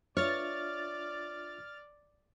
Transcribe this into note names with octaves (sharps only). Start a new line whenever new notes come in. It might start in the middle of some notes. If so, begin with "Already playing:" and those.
D4 F4 C#5 D5 E5 F6 A6